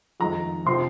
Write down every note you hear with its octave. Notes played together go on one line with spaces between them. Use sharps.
F2 D#3 G#3 A#5
C3 F3 C4 C6